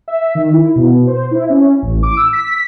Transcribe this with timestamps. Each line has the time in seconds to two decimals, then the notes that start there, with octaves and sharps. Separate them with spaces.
0.08 E5
0.35 D#3
0.53 E4
0.76 B2
1.07 C5
1.31 E4
1.49 C#4
1.82 A1
2.03 D6
2.17 E6
2.33 B6